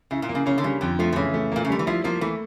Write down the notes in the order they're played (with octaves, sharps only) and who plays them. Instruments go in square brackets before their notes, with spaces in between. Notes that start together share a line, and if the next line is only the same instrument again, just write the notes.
[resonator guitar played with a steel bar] C#3 [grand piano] E4
[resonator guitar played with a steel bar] A#2
[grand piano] A#3
[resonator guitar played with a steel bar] C#3
[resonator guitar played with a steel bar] C#3 [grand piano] C#4
[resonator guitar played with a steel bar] D3
[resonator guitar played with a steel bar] C#3 [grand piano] G3
[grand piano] F2 [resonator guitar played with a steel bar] D3
[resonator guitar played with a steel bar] F3 [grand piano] A3
[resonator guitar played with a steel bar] F3
[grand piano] C#3 [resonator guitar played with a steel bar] E3
[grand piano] A3
[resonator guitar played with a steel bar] A#2 [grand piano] A#3
[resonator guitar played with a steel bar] C#3
[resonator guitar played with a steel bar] D3 [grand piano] G3
[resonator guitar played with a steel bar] E3
[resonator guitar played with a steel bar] F3 [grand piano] E4
[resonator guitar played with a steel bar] F3 [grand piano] A#3
[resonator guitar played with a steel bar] E3 [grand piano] A3